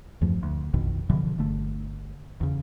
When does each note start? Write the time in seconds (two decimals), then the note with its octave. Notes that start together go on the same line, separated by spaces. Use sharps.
0.21 E2 G2 F3 A3
0.43 D2
0.74 A#1 F2 B2 D#3
1.10 B2 D3 E3 F3
1.38 G1 D3 A3
2.41 E2 C#3